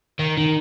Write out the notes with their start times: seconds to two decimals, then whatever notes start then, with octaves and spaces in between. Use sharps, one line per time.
0.19 D#3
0.37 D#3